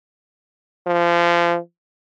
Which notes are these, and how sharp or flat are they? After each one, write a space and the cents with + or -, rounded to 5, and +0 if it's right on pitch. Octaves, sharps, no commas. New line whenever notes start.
F3 -25